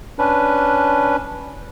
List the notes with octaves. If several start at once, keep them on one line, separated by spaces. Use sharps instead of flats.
C#4 D4 B4